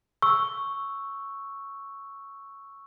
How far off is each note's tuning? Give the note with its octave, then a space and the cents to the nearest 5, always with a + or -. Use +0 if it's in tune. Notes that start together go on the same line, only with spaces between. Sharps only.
C#6 +0 E6 +0